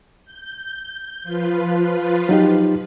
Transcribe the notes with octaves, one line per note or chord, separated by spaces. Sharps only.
G6
F3 F4 B4
F#3 D#4 G4